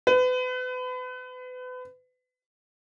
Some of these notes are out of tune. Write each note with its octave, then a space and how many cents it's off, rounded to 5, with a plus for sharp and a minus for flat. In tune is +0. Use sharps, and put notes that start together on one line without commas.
B4 +35